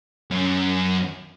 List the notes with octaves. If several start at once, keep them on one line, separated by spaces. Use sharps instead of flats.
F#2 C#4